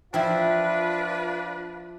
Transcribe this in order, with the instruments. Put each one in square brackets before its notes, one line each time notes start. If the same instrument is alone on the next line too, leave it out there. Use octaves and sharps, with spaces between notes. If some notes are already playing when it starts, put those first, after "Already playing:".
[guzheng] F3 E4 [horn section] D4 F4 B4 [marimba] E5 G5